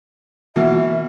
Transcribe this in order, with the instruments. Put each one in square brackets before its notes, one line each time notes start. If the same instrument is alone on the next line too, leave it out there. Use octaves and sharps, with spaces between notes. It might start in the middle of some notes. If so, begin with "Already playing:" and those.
[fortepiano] B2 E3 A#3 [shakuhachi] E5